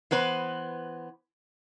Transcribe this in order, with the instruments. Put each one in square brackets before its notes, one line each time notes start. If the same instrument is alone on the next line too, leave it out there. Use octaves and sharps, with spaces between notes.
[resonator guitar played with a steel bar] E3 B3 B4 C5